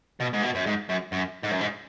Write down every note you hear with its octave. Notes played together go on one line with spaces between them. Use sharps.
B2
G#2
B2
F#2
G#2
F#2
F#2
G#2
F#2
G#2